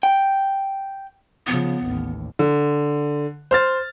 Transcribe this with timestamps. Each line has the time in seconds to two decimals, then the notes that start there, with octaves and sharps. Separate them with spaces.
0.03 G5
1.47 C#3 F3 B3
1.85 A1 D#2
2.39 D3
3.51 C5 F6 A6